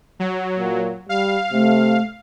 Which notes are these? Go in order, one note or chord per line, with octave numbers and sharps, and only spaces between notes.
F#3
A#2
G3 F5
C3 A3